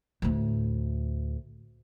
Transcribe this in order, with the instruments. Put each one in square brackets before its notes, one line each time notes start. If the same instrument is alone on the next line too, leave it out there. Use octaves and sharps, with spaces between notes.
[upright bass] D2 A2